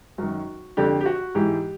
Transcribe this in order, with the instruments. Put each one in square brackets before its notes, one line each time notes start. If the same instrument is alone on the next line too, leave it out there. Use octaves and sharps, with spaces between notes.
[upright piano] F#2 D#3 F#4
F2 D3 G4
G4
F#4
G#2 E3 G4